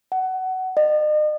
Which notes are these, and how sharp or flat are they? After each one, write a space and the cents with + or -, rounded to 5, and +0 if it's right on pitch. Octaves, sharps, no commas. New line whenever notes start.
F#5 +20
D#5 -40